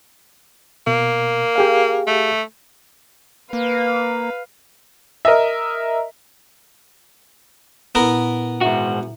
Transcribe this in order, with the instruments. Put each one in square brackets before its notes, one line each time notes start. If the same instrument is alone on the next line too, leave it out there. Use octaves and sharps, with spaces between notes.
[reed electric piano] B2 [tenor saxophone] A#3
[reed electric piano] G4 G#4 F5
[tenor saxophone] A3
[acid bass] A#3 [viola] B4 F5
[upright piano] A#4 D#5 E5
[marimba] A#2 E4 A#6 [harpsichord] B3 A#4
[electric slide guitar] G#2 F#4 [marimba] E5 A#5